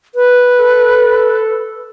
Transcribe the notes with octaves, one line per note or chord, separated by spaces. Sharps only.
B4
A4